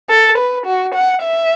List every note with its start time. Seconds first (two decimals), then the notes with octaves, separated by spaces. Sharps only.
0.10 A4
0.38 B4
0.66 F#4
0.95 F#5
1.24 E5